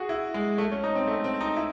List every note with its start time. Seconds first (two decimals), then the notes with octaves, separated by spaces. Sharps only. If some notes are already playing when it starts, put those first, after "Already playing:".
Already playing: F#4 G#4
0.09 E4
0.34 G#3
0.58 A3
0.71 C#4
0.84 D#4
0.95 C4
1.07 A3
1.24 C4
1.41 D#4
1.56 E4